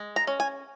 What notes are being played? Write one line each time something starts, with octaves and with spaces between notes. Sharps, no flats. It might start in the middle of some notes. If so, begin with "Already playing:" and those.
Already playing: G#3
A#5
C#4
G#5